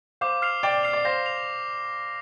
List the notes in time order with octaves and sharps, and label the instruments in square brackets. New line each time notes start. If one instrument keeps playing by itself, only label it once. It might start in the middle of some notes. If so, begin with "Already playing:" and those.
[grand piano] C5 F5 [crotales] D6
[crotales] F6 C7 F7
[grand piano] D5 G5 [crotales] D6
[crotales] F6 C7 F7
[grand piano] D5
[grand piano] C5 F5 [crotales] A#6
[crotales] F7